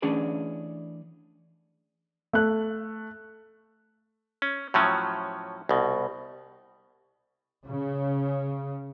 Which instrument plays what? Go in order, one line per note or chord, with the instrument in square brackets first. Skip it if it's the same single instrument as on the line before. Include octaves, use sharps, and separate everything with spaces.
[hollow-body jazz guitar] E3 A3 C#4 D4 G#4 B4
[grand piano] A3 F#6
[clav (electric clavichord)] C#4
A2 F3 F#3 C#4
C2 B2
[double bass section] C#3